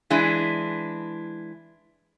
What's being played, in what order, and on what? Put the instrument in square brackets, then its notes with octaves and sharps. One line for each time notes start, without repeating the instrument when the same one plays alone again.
[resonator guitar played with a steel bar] E3 G#3 D4 E4